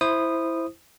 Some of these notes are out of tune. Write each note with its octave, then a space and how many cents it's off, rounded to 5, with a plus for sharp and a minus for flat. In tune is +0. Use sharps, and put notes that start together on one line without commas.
E4 +0 C5 +0 D#6 -15